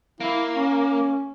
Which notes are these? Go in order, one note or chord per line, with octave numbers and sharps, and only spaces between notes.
A#3 E4
C#4